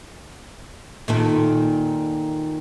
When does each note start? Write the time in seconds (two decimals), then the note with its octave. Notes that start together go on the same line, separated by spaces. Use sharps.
1.08 A#2 D#3 A4